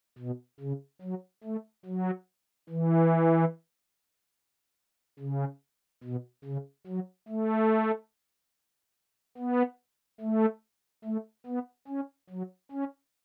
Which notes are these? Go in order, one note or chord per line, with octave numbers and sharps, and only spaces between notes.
B2
C#3
F#3
A3
F#3
E3
C#3
B2
C#3
F#3
A3
B3
A3
A3
B3
C#4
F#3
C#4